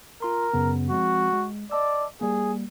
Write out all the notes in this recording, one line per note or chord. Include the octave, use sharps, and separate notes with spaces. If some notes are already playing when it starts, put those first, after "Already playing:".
F4 A#4 C6
F#2 C#3 B3
F3 G#3 C4 F#4
G#3
D5 D#5 A5 E6
G3 A#3 G#4